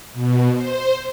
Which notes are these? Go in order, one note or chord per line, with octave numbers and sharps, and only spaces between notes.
B2
C5